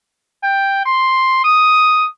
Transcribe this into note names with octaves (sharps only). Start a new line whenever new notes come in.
G5
C6
D#6